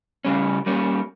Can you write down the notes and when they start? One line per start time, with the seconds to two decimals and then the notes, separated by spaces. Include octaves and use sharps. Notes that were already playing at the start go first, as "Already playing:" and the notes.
0.25 C#3 G3 C#4
0.66 G3 A#3 C#4